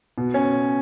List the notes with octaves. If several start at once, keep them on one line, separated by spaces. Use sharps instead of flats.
B2
C#4